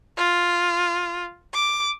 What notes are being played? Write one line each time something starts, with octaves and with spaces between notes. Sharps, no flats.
F4
D6